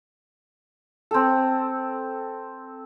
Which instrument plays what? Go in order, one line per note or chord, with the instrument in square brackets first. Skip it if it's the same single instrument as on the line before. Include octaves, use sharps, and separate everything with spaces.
[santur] C4 A4